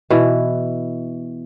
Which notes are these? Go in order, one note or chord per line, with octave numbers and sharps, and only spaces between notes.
B2 E3